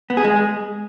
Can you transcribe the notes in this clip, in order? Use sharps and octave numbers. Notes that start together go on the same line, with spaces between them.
B3
G#4
G#3